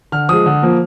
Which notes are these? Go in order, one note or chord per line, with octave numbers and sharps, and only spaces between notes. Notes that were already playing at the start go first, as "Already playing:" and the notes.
D3 F6
F3 G#3 D#6
D3
F3 A#3